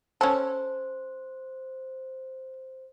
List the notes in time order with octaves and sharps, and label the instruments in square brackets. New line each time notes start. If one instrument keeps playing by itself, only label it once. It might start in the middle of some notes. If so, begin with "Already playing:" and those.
[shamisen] C#4 A4 [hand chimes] C5